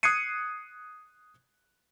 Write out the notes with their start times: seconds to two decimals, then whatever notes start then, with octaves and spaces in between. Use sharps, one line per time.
0.03 D#6 F#6 G#6 C7 C#7 D#7